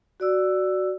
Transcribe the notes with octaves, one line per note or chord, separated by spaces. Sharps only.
F#4 D5 E6